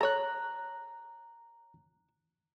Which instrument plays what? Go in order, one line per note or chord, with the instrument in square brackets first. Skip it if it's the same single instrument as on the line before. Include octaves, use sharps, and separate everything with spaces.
[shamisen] A4 C#5 [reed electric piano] A#5 F#6